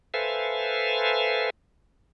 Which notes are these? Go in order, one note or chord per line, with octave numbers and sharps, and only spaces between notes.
A4 B4 C5 E5 F5 G#5